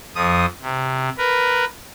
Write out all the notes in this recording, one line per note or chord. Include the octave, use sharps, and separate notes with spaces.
F2 F3 D#6
C3
A#4 B4